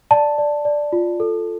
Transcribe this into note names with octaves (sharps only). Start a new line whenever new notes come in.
D5 A5
D5
D5
F4
A4